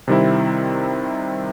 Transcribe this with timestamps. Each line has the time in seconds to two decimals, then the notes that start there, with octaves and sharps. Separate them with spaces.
0.08 C3 D#3 G3 C4 E4